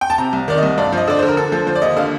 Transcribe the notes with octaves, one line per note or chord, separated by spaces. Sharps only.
G5
A5
C3 A#5
C2
D#3 D5
D#5
C2
G2 D5
F3 D#5
D3 D5
D3 C5
A#4
D3 A4
F3 A4
F3 C5
D5
D#2 D#5
D3 F5